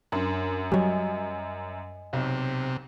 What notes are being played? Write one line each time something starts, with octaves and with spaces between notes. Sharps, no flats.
F#2 D4 A#4 C6
F#3 G3 D#5 G#5
B1 C3